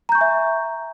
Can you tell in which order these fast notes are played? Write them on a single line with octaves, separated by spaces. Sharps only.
A#5 G6 C#6 G#5 E5